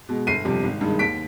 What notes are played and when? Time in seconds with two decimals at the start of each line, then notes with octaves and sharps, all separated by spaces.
0.09 B2 G#3
0.27 G1 C7 D#7
0.45 F2 C3 G3
0.63 G#1
0.81 G2 D#3 G#3
0.99 D#2 B6 D7